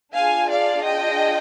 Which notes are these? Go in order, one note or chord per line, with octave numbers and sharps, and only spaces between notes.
D4 F4 G#4 F5 G#5
D5 F5
D#5 G5